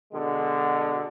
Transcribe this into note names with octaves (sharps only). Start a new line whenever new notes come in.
B2 D3 G#3